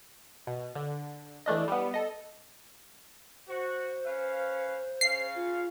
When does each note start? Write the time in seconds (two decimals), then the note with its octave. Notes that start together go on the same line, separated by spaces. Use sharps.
0.47 B2
0.75 D3
1.46 E3 A3 D4 D#5
1.68 G3 B3
1.94 A4 D#5
3.48 F#4 C5
4.06 C#4 B4 F5
5.01 C#3 C#4 F5 C7
5.35 F4